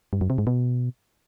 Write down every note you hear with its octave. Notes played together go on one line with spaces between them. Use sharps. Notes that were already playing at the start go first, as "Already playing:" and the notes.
G2
F#2
C3
G#2
B2